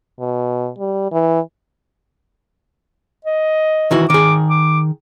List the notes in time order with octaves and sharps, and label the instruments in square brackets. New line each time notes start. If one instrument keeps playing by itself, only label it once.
[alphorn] B2
G3
E3
[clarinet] D#5
[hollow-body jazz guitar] D#3 E3 F#4
[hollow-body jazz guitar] D#3 G#4 [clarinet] D6
[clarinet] D6